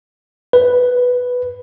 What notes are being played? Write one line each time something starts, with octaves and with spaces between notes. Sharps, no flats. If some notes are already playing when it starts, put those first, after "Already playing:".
B4